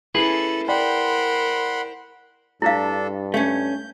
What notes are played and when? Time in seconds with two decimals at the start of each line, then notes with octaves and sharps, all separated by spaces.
0.15 C#4 E4 G#4 A4 B4 C7
0.68 A#4 C5 D5 F#5 G5 B5 C6
2.62 G2 D4 E4 A4 F5
3.34 A3 C#4 G6